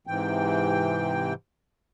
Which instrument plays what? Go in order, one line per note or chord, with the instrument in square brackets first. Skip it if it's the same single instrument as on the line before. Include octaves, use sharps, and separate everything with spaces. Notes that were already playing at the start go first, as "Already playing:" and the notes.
[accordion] G#2 C3 E3 G5